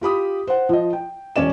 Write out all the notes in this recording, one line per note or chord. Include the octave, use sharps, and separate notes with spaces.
F4 G4 B5 D#6
C5 F#5
F3 D#5
G5
E1 C#4 D5 E7